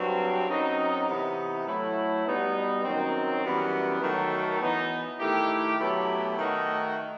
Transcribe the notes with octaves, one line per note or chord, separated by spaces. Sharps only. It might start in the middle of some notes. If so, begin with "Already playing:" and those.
Already playing: G2 F#3 C4
F#2 F#3 C4 D#4
C3 E3 B3 D#4
A2 F#3 A3 E4
B2 G3 B3 D#4
F#2 D#3 F#3 C4
F#2 E3 G3 B3
D#3 F#3 A3
E3 B3 D#4
D#3 A3 E4 G4
B2 F#3 A3 E4 G4
D#3 A3 D#4 F#4